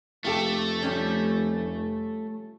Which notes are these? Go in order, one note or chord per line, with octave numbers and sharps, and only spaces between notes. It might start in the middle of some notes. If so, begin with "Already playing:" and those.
F1 A3 F4 G4 A4
F3 G3 C#4